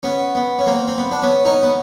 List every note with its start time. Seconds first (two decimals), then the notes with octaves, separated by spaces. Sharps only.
0.03 B3 C#4
0.35 B3
0.59 C#4
0.66 A#3 C4
0.88 C4
0.98 B3
1.11 D4
1.22 B3 C#4
1.45 C#4 D#4
1.63 B3